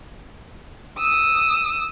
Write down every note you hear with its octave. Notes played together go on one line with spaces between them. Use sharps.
D#6 E6